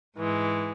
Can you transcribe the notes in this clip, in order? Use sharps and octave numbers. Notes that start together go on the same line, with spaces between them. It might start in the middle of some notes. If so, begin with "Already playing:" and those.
G#2 E3 G#3